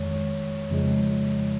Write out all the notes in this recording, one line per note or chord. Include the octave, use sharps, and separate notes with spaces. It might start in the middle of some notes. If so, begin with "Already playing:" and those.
Already playing: F2 D#3 G#3 C#5
F2 C#3 F3 G#3